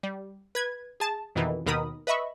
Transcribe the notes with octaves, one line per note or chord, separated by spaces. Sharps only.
G3
B4 G#6
G#4 A5
F2 B2 D#3 E3
D#2 B2 D#3 A#4 B5 D#6
B4 D#5 E5 B5 C#6